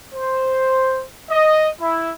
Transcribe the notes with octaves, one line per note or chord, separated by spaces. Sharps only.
C5
D#5
E4